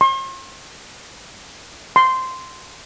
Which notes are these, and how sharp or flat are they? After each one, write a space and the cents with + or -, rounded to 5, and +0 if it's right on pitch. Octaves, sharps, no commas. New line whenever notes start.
C6 +45
C6 -10